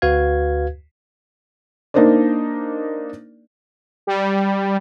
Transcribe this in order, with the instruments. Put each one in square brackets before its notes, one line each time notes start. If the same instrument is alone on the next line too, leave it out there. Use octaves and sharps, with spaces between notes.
[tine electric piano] D2 F#4 B4 F5 G#6
[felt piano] A#3 D4 D#4 A#4 C5 D5
[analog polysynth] G3